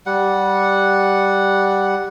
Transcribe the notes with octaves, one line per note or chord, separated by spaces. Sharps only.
G3 F#5